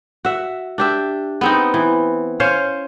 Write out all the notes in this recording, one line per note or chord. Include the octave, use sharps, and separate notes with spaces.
F#4 E5
D4 G4 E5
B3 C4 D#4
E3
C#4 C5 C#5 F5